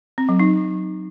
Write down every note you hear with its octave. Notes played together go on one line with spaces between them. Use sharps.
C4
F#3
D#4